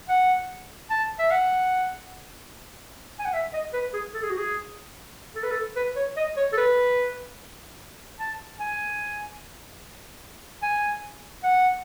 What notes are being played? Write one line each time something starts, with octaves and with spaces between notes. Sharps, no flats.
F#5
A5
E5
F#5
G#5
F#5
E5
D#5
B4
G#4
A4
G#4
F#4
G#4
A4
B4
A4
B4
C#5
D#5
C#5
A4
B4
A5
G#5
G#5
F#5